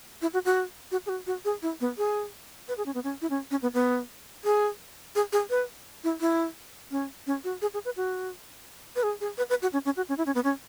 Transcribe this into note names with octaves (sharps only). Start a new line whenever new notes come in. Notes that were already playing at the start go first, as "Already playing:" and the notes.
E4
F#4
F#4
F#4
G#4
F#4
F#4
G#4
E4
B3
G#4
B4
G#4
C#4
B3
C#4
E4
C#4
C#4
B3
B3
G#4
G#4
G#4
B4
E4
E4
C#4
C#4
F#4
G#4
G#4
B4
F#4
B4
G#4
G#4
B4
B4
F#4
C#4
C#4
F#4
C#4
E4
C#4
B3
C#4